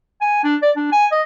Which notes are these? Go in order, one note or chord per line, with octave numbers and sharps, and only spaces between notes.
G#5
D4
D5
D4
G#5
D#5